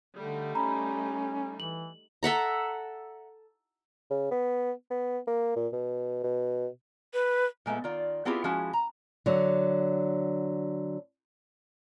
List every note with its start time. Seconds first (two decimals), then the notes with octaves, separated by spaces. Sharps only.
0.16 D3 G3 A3 D#4
0.55 C#4 A#5 B5
1.60 E3 F#7
2.23 A4 E5 F#5 A#5
4.11 C#3
4.31 B3
4.91 B3
5.27 A#3
5.56 A#2
5.73 B2
6.24 B2
7.14 B4
7.66 A#2 G#3 A3 B3
7.84 D#3 F4 D5
8.25 B3 C4 E4 F4 G4 G#4
8.44 F3 G#3 C#4 E4 F#4
8.73 A#5
9.26 D3 F#3